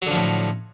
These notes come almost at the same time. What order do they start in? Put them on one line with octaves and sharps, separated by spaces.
F#3 D3 F3 A2